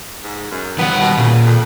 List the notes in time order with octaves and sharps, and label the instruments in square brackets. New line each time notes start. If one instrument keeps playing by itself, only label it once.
[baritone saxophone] G#2
F#2
[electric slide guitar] D#3 G3 F#5 [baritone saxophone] B3
[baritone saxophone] B2
[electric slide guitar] A#2 [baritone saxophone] C#3
[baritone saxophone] F2